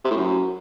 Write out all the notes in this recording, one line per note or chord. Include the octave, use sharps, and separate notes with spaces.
C3
A2
F#2